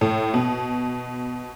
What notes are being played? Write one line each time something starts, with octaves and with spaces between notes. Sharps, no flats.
A2
B2